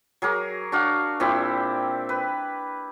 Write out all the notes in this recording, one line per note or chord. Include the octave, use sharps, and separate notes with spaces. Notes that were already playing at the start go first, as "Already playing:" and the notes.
F#3 G#4 A#4 D6
D4 F#4 F5
A#2 C4 E4 G4
B4